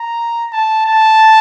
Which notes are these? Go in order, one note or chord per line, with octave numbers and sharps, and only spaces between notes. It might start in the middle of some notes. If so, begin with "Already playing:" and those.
Already playing: A#5
A5
A5